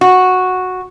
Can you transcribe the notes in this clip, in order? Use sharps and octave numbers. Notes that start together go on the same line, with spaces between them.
F#4